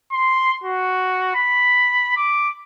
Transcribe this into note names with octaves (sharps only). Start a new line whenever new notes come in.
C6
F#4
B5
D6